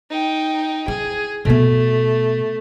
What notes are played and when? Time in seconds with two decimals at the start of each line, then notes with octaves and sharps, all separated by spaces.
0.11 D#4 G5
0.88 E4 G#4
1.45 B2 A3 B3